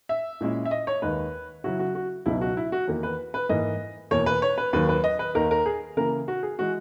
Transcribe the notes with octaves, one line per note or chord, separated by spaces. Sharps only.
E5
A#2 G#3 C#4 E4
E5
D#5
C#5
D#2 D#3 G#3 D#4 B4
C#3 F#3 C#4 E4 F#4
F#4
F#4
C#2 B2 F#3 B3 D#4 E4
F#4
E4
F#4
E2 D#3 A#3
B4
B4
G#2 E3 A#3 D#5
E2 B2 A#3 C#5
B4
C#5
B4
D#2 D#3 F#3 A#3 B4
B4
D#5
B4
D#2 D#3 A#3 D#4 A#4
A#4
G#4
C#3 E3 A#3 A#4
F#4
G#4
E3 G#3 F#4